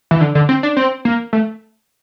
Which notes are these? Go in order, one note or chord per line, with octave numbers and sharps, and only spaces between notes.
E3
D3
D3
C4
D4
C4
A#3
A3